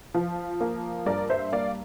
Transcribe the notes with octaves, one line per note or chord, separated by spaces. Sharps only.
F3
A#3
G2 A#4 D5
C5 E5
A#3 D5 F5